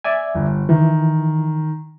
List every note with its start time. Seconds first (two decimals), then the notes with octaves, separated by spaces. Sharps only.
0.04 D5 E5 G#5
0.35 G1
0.69 D#3 E3